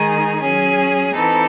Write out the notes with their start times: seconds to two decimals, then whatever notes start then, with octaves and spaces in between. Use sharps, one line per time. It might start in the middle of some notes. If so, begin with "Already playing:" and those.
Already playing: D#3 G#3 D#4 G#4
0.40 F#3 C#4 G#4
1.13 E3 C4 D#4 A4